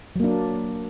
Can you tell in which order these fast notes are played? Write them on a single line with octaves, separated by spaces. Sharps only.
F#3 A#3 D4